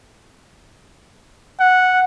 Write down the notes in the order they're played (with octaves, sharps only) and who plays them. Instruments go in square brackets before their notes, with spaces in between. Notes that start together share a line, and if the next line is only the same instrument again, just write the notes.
[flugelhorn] F#5